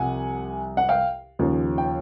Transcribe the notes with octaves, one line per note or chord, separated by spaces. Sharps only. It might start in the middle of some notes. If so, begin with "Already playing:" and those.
Already playing: C2 C3 F3 F#5 G#5
F#5
F5 G5
D#2 C#3 F3
G5